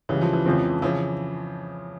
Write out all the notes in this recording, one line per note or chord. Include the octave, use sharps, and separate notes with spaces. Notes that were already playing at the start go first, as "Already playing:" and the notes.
C#2 C#3 E3 G3
F3
E3
F2 C#3 F3 G#3 C4
C#3 E3 F3